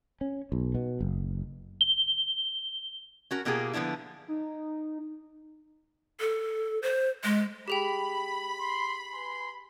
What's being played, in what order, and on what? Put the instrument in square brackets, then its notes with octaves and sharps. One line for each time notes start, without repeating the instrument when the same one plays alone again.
[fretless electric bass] C#4
B1
B2
F#1
[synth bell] G7
[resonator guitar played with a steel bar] C#4 F#4 A#4
B2 A#3 F4 G4 G#4
D3 F3 B3 D4 E4
[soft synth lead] D#4
[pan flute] A4
C5
G#3
[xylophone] G4 G#4 G5 [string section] B5
[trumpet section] C6
B4 G#5 C6